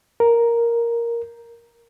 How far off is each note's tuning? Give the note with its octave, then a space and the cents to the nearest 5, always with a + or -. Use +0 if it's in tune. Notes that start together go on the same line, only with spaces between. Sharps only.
A#4 +5